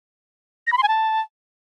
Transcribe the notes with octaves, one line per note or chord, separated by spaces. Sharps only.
A#6
B5
C6
G#5
A5